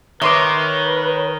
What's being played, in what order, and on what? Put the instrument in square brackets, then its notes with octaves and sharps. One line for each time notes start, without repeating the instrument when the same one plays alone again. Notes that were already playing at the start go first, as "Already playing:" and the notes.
[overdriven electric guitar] D#3 [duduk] B4 [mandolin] C#5 [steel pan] E5 C6 D6